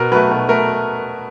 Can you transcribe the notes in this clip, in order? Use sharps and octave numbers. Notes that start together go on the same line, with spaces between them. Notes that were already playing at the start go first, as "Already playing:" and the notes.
Already playing: B2 A#4
F#3 A3 B4
B2
A3 A#4